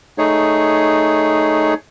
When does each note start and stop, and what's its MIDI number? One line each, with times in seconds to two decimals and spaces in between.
0.18 1.74 57
0.18 1.74 63
0.18 1.74 68
0.18 1.74 73